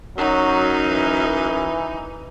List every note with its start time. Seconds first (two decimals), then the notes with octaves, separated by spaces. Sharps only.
0.18 F#2 F#3 D#4
0.87 E3